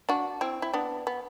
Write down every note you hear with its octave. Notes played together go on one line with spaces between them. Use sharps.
D4 F#4
C4 E4
E4
B3 D4
B3